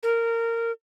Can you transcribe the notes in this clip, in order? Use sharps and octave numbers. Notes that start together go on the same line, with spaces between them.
A#4